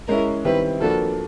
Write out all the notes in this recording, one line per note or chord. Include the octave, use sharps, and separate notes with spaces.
G#3 C#4 E4 A#4
D#3 G3 C4 E4 B4
F3 A#3 D4 F#4 A4 B4